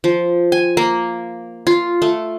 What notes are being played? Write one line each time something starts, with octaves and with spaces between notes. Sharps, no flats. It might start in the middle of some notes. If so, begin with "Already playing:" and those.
F3
G#5
A#3
F4
A3